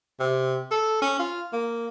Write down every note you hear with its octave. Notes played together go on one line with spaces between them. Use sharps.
C3
A4
C#4
F4
A#3